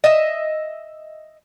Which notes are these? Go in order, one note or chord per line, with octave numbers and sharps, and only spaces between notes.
D#5 E5